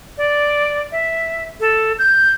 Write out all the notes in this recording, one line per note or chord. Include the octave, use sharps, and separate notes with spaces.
D5
E5
A4
G6